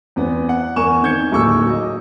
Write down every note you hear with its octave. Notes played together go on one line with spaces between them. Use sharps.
E2 B3 C4
F#5
E2 A#4 G#5 C#6 E7
D#3 C4 G6 G#6 C#7
D1 D#2 G#4 C#6 D6 E6
F#3 D#5